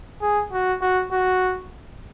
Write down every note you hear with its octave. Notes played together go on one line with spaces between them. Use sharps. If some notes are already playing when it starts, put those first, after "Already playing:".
G#4
F#4
F#4
F#4